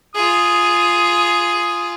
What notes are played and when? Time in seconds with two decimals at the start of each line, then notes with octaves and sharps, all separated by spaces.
0.15 F4 G#4 D#6